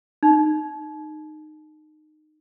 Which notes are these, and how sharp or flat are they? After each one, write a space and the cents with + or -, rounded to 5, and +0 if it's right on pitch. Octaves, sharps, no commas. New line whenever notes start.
D#4 -20